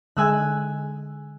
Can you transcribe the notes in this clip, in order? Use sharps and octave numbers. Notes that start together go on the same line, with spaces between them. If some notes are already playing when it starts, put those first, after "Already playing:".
D3 G#3 G#5 E6 F#6